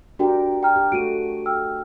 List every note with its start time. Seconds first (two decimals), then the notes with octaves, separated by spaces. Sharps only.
0.19 D4 F#4 G4 A#4 G5
0.63 G5 A#5 F6
0.76 G4
0.92 A3 F#4 D7 D#7
1.46 G5 E6 F6